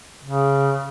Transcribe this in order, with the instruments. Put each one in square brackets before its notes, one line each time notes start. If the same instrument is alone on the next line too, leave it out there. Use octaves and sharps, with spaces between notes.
[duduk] C#3